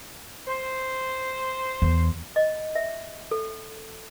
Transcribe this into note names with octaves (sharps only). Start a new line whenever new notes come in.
C5
E2
D#5
E5
A4